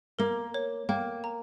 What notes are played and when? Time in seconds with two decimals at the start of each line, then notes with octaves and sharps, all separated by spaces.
0.19 A#3 A#4
0.54 C#5
0.89 A#3 G5
1.24 A#5